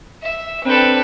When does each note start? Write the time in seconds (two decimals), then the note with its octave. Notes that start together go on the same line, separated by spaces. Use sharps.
0.23 E5
0.65 C4 D4 A4 B4 G5